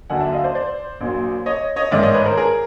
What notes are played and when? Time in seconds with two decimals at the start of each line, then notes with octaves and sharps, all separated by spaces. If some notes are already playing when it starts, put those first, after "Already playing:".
0.10 D#2 D3 F#3 F#5 G#5
0.21 D5 E5
0.32 D#5 F5
0.44 C5 D5
0.55 C5 D5
1.01 A#1 A#2 F#3
1.46 C#5 D#5
1.76 C#5 D#5
1.91 A1 G#2 D#3 D5 E5
2.03 C#5 D#5
2.14 B4 C#5
2.26 A#4 C5
2.37 G#4 A#4